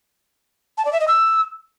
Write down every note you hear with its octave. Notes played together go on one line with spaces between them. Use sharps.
A5
D5
E5
D#5
E6